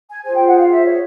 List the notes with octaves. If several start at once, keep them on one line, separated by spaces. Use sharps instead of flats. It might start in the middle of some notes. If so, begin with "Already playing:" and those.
G#5
F4 G#4 C5 G#5
G5
F#5
F5
E5
C#5